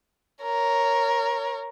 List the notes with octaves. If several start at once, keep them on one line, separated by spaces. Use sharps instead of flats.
A#4 C#5